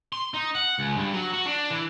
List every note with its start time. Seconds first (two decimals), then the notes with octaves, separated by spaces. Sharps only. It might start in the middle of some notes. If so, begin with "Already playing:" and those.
0.13 C6
0.34 D#4
0.55 F#5
0.79 C#2
0.97 G2
1.13 F#3
1.34 F#4
1.46 D4
1.71 E3